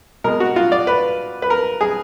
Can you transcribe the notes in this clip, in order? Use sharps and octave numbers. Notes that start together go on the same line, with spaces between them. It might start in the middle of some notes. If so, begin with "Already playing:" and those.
B2 G#3 A#4
F#4
F4
D5
B4
B4
A#4
G#4